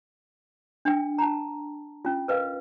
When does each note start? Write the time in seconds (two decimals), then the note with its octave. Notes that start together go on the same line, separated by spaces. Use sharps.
0.85 D4 G5
1.18 A5 A#5
2.05 C#4 F4
2.28 A#4 B4 D#5 F5